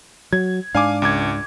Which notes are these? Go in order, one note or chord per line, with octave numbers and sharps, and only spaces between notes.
F#3 G#6
G#2 D4 F5 G#5 D6
C#2 D6 G#6